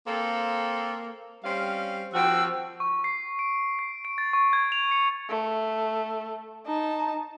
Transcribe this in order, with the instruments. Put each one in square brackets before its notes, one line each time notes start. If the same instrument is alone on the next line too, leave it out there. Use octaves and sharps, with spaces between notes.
[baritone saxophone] A#3 [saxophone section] C4 A4
[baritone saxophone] G3 [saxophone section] C4 C#4 F5
[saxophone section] D#2 C4 F#4 [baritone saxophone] F3 [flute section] G5 E6
[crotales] C#6
C7
D7
C7
D7
A6
C#6
G#6
F7
C#7
[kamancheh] A3
D#4 A5